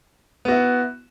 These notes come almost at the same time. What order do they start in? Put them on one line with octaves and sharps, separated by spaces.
B3 F#4 E4